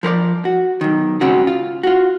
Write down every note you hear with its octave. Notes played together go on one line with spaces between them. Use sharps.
F3 A#4 C5 D5
F#4
B1 D#3
G#2 C#3 C4 C#4 F#4
F4
F4 F#4